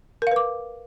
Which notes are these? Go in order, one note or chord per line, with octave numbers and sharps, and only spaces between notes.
A#4 B4 F5 D6